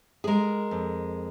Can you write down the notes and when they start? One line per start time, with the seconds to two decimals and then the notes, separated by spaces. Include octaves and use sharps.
0.24 G#4
0.27 G#3 A#4
0.71 F2